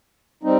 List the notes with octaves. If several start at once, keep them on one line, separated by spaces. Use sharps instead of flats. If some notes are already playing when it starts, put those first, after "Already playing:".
G3 C4 D#4